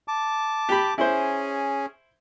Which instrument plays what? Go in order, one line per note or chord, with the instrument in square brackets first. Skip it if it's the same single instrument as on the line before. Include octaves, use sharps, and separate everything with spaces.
[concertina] A5 D6
[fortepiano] G4 B5
[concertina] C#4 G#4 [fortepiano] E4 C5